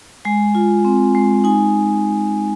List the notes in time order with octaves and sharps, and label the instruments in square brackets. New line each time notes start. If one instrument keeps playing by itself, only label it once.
[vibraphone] G#3 G#5
F4
C4
G#3
D#4 G#5